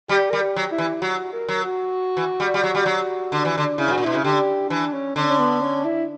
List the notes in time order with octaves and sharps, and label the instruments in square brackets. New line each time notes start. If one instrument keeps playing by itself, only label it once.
[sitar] G3 [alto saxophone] G4
[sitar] G3 [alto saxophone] A#4
[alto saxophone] G4
[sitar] F#3
[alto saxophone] E4
[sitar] E3
[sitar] F#3 [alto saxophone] F#4
[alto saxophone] A#4
[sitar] F#3
[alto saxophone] F#4
[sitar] E3
G3
G3
F#3
G3
F#3
D3
E3
D3
[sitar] C#3 [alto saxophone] E4
[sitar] G2 [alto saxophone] F#4
[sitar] A#2
[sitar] B2 [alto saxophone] E4
[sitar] C#3
[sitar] D3 [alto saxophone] G4
[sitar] E3 [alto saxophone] D4
[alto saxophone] C#4
[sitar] D3 [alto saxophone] C#4
[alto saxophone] C#4
B3
C#4
E4